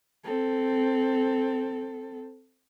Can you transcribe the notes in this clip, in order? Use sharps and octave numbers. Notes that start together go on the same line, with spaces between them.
C4 A4